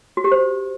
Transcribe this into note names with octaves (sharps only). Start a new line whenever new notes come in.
F#4
G4
C5